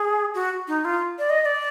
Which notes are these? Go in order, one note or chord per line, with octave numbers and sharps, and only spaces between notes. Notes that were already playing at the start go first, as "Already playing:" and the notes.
Already playing: G#4
F#4
D#4
F4
D5
D#5
D#5
D5